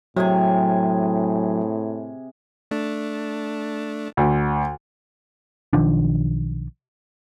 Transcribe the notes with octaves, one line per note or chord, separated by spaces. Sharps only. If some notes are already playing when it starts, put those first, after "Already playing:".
A2 C3 F#3 G#4 G#5
A3 D4
D2
B1 D#3 F3 D4